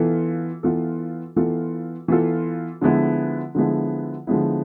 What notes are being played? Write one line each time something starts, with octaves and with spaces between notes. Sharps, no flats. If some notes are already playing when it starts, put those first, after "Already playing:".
Already playing: E3 B3 F4 A4
E3 B3 F4 A4
E3 B3 F4 A4
E3 B3 F4 A4
D3 F3 G#3 B3 E4
D3 F3 G#3 B3 E4
D3 F3 G#3 B3 E4